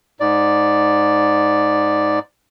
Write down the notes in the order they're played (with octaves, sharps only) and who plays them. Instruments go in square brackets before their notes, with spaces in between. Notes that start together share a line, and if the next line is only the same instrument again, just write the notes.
[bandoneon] G#2 D5